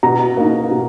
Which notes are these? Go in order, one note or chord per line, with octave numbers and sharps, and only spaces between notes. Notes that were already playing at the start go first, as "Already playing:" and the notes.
B2 A#5
A#3 D#4
B2